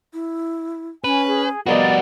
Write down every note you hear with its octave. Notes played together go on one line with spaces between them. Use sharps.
E4
C#4 B4 G#5
G#4
G3 B3 F#4 A#4 D5 D#5 F5